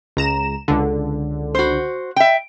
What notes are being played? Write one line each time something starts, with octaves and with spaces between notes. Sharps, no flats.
C#2 A#5 E7
C#2 D3
F#4 C5
E5 G5